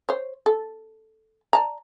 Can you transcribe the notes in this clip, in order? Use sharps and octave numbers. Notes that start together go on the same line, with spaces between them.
C5 C#5
A4
D5 A5 A#5